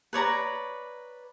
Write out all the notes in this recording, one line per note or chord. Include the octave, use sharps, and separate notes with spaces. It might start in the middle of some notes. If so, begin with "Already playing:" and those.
B4 C#5 D5 A#5